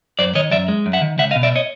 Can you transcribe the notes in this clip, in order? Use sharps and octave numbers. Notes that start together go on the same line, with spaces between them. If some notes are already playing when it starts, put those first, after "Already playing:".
F#2 C5 D5
D#3 C#5 D#5
F#2 D5 E5
G#3
F#2
E5 F#5
D#3
C#2 E5 F#5
D#5 F5
B2
D5 E5
C#5 D#5